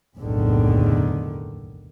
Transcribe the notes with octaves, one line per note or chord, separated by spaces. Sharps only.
F#1 B1 E2 A2 D3 D#3